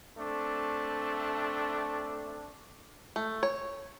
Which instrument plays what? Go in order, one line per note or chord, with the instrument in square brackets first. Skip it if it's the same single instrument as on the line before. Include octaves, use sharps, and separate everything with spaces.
[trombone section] A3 C4 D4
[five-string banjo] A3
C#5